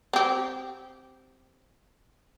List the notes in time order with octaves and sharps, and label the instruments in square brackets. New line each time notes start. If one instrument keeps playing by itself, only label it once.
[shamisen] C4 G4